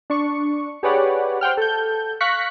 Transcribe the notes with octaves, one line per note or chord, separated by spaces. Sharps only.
D4 C#6
G4 G#4 B4 C#5 D5 F#5
C5 F#5 G5 F6
A4 G6
F5 C#6 F#6 A#6 B6 C#7